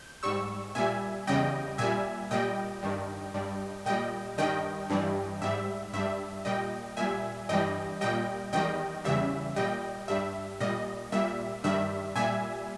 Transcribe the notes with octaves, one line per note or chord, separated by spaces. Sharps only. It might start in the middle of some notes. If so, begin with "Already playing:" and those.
Already playing: G6
G#2 G3 C#6 E6
A#2 G3 E5 G#5
E2 C#3 G3 D#5 G5
A#2 G3 E5 G#5
A#2 G3 D#5 G5
G2 D#3 G3
G2 G3
A#2 G3 D#5 G5
G2 D#3 G3 D#5 G5
G2 E3 G3
G#2 G3 E5
G2 G3 E5
A#2 G3 D#5 G5
A#2 G3 E5 G#5
G2 E3 G3 D#5 G5
A#2 G3 D#5 G5
E2 D#3 G3 D#5 G5
E2 C#3 E3 G3 E5
A#2 G3 D#5 G5
G2 G3 E5
A#2 G3 D#5
A#2 G3 E5
G2 D#3 G3 E5
A#2 G3 E5 G#5